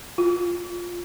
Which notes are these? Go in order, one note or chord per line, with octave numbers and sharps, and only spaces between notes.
F4